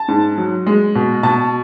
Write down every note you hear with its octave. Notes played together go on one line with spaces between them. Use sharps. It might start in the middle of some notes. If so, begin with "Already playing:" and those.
Already playing: A5
G#2
F#3
G#3
B2
B2 A5